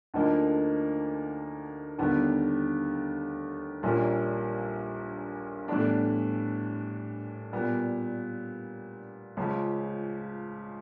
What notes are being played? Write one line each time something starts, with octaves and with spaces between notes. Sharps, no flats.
D2 D3 F3 A#3 D#4
D#2 D3 G3 B3
A#1 A#2 G3 A#3 C#4
A2 E3 G3 B3 D4
A#2 G3 B3
C#2 C#3 F3